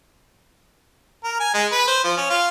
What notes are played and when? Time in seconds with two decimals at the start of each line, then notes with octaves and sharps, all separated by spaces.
1.24 A#4
1.40 G#5
1.54 G#3
1.72 B4
1.88 C5
2.04 F3
2.17 C#4
2.30 F4